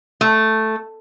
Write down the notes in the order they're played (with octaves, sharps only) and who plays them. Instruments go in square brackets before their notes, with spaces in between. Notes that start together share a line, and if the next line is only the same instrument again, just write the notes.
[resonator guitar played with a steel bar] A3